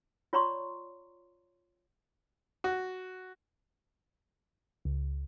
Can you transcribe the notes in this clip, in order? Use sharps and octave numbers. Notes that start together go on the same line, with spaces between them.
F4 C#5 D5 A#5 C6 C#6
F#4
C#2